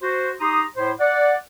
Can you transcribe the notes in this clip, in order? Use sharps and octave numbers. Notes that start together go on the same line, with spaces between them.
F#4 C5
D#4 G4 A#5 C6 D#6
A2 E4 C5
D5 F#5